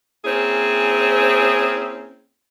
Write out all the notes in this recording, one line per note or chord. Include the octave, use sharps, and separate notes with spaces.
A#3 C4 C#4 E4 G#4